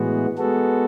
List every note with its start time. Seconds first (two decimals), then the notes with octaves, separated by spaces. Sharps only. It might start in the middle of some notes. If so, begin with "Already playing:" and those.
Already playing: A2 E3 G#3 B3 F#4
0.38 G#3 B3 F#4 A4